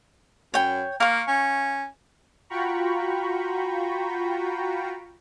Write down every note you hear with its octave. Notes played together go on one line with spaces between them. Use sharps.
F#2 C#5 G5
A#3 F5 C#6
C#4
F4 F#4 G5 A#5 B5 C#6